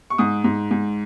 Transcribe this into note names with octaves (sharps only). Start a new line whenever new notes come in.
C#6
G#2 D#6
G#2
G#2